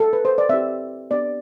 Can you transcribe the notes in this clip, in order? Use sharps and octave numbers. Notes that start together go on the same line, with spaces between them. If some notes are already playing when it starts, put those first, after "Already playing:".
A4
B4
C5
D5
C4 E4 G4 E5
B3 D4 G4 D5